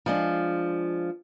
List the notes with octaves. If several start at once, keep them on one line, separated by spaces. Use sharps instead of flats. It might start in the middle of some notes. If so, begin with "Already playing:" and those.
F3 G#3 D4